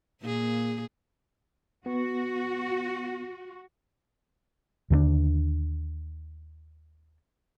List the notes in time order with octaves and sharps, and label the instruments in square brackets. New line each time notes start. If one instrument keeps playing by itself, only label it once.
[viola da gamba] A#2 A#3 G#4
[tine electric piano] B3 [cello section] F#4
[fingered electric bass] D#2 D3 G#3 D4